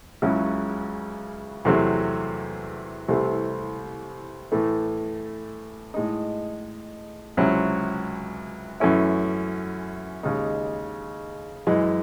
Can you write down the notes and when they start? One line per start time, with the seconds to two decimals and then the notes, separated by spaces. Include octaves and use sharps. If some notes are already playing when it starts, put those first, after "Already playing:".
0.22 C#2 C#3 F#3 C#4 E4
1.65 E2 C3 F#3 A3 C4
3.09 C2 C3 E3 A3
4.52 A2 E3 A3
5.94 A2 G#3 D#4
7.37 C#2 C3 F#3 C#4 E4
8.80 F#2 E3 A3 C#4 E4
10.23 D#2 C#3 G#3 D#4
11.67 F#2 E3 G#3